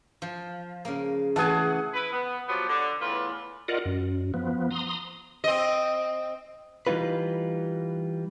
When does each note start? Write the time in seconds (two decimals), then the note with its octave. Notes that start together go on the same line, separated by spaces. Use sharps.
0.22 F3
0.85 C#3 A#3
1.36 E3 A3 G#4 F#5 G#5 A5
1.94 E4 B4
2.12 B3
2.48 F3 F#3 B3 G4
2.67 D3
3.01 E2 A2 F4 B4 D5
3.68 F4 A#4 D5 D#5 F#5
3.85 F#2
4.34 F3 B3
4.71 A#5 C6 D#6
5.44 C4 D#5
6.87 E3 G3 D#4 F4 B4